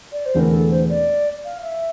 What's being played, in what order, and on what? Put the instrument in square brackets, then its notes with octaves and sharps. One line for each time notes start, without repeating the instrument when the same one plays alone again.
[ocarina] D5
C5
[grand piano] E1 E2 D3 A3 C4 [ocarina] A#4
[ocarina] A4
C5
D5
F5
E5